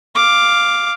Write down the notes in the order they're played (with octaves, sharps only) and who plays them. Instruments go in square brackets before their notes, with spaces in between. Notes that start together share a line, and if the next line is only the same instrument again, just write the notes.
[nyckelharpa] F5 D6